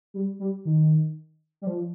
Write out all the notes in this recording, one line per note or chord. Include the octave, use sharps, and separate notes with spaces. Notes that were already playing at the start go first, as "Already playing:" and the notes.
G3
G3
D#3
G3
F3